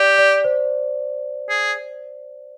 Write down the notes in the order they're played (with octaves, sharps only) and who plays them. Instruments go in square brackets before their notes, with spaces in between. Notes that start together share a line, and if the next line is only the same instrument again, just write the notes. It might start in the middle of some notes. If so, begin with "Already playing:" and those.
Already playing: [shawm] G4 [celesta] D5
[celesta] D5
C5
[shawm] G#4